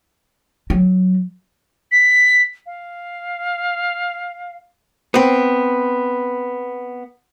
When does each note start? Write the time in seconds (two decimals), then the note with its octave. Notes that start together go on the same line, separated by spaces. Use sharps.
0.70 F#3
1.92 B6
2.66 F5
5.14 B3 C4